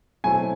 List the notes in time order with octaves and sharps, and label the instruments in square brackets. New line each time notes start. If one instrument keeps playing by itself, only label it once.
[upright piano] B2 F#3 A3 C4 E4 [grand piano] G#5